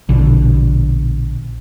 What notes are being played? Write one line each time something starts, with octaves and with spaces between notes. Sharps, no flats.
A#1 B2 D3